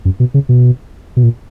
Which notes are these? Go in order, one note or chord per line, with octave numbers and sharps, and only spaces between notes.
F#2
B2
C#3
B2
B2
A#2